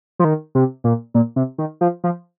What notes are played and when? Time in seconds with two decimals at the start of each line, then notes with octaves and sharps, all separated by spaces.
0.19 F3
0.24 D#3
0.55 C3
0.84 A#2
1.14 A#2
1.36 C3
1.58 D#3
1.81 F3
2.04 F3